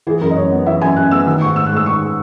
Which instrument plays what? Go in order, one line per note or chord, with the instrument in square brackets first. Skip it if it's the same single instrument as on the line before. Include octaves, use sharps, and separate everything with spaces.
[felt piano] E3 G#4
F#2 A#4
D#5
F#2 C#5
B3
E3 E5
F#2 G#5
F#2 F#6
B3 E6
D#3 E6
G#2 C#6
G#2 E6
F#6
G#3 E6
D#3 C#6